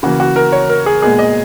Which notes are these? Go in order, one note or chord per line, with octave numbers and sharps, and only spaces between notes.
C#3 E3 A#3 F#4
F#4
A#4
C#5
A#4
G#4
A#2 G#3 B3 G#4
D#5